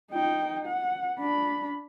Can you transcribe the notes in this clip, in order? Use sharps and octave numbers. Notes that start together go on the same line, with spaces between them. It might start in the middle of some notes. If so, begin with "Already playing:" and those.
D#4 G5
F#5
D4 B5